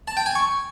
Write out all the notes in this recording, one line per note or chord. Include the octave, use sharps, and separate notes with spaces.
A5
G5
G#5
C#6